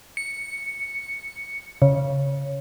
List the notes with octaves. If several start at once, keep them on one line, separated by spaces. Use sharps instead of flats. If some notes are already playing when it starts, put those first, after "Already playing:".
C#7
C#3